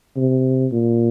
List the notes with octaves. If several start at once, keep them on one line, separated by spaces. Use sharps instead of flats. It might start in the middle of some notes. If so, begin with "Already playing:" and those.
C3
A#2